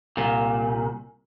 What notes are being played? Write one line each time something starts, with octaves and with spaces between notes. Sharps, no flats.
C2 A#2